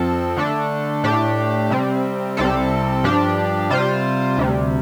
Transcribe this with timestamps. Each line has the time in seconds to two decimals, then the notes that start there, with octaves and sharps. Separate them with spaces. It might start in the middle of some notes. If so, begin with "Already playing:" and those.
Already playing: F2 F3 C4 A4
0.37 D3 A3 D4 A4
1.04 A2 A3 D4 G4
1.70 C3 G3 C4
2.37 C2 C3 G3 C4 A4
3.04 G2 F3 D4 G4
3.70 C3 G3 F4 C5
4.37 D2 C3 G3